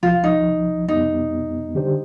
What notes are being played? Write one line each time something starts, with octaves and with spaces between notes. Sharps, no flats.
C2 C3 F3 F4
D#4
F2 C3 G3 B3 D#4
D3 G3 D4 G4 C5